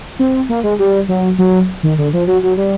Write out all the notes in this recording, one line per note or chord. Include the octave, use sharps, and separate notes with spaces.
C4
A#3
G#3
G3
F#3
F#3
D#3
D3
F3
F#3
F#3
G3